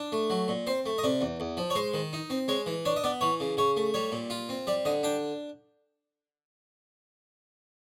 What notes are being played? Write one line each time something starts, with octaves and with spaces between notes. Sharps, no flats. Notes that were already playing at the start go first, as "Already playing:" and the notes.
Already playing: D4
A3
F#3
A#2
C4 C5
A3
D#5
C3 D5
E2
E2
F3
C#5
G#3 C5
D#3
D#4
C4
G#3 C#5
E3
D4 C#5
D#5
B3 D5
E3 C#5
C#3
C#3 C#5
A3
G3 C#5
A#2
F4
C4
G3 D5
D3 D#5
D4 G5